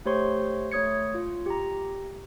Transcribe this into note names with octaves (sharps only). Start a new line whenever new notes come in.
A3 G4 C5 C#5 C6 C#6
A3 C#5 D#6 G#6 C#7
F4
G4 A#5